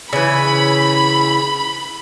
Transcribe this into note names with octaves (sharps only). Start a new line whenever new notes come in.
C#3 E3 B5